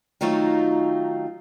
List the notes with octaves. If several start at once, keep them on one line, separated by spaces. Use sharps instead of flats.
D#3 F#3 A3 D#4 F4